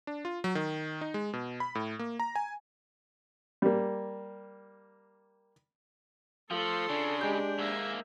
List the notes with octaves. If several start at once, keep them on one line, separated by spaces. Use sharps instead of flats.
D4
F4
F#3
D#3
D#4
G#3
B2
B5
A2
A#3
A#5
G#5
G3 A#3
F3 A3 F4 A4 C6
C#3 D4
G#3 G4 G#4 G6
G#2 A#3 E5 G#5